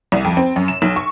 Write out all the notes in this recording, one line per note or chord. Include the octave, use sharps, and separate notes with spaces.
C2
F2
C4
F#2
E7
B1
C#6